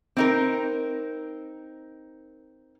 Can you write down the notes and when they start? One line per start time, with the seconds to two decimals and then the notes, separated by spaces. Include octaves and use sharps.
0.17 C4 D#4 A#4